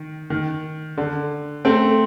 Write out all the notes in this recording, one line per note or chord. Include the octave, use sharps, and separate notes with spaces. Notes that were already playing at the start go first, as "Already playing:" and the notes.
Already playing: D#3
D#3
D3
A3 C4